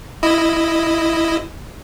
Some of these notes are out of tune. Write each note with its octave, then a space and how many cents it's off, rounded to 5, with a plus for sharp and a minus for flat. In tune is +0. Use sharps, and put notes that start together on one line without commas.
E4 +0 D#5 +0